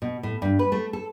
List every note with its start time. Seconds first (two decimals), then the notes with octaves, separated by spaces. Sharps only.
0.02 B2
0.23 A2
0.42 G2
0.59 B4
0.72 A3
0.93 A4